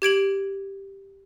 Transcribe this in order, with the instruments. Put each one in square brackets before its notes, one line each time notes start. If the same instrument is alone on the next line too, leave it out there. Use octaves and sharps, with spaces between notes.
[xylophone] G4 G#6 D7 F#7